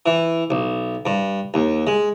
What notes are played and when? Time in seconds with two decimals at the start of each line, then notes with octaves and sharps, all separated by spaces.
0.06 E3
0.50 B1
1.06 G2
1.54 D#2
1.87 G#3